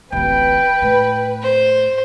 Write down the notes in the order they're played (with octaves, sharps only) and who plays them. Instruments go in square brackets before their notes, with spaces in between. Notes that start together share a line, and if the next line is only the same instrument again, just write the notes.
[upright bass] D1 A1 [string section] B4 [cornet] G5
[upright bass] A2
[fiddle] C5